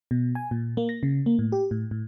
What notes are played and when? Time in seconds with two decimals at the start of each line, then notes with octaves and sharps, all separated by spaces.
0.11 B2
0.35 G#5
0.51 A#2
0.77 A#3
0.89 A#6
1.03 C#3
1.26 A#3
1.39 A2
1.52 G4
1.71 A2
1.91 A2